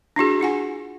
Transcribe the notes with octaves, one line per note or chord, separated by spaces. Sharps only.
D4 E4 F#4 G#4
E4 F4 F#5 G#5